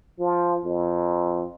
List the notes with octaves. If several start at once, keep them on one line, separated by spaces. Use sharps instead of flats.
F3
F2